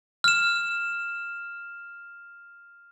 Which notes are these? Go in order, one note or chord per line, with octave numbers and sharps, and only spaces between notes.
F6 E7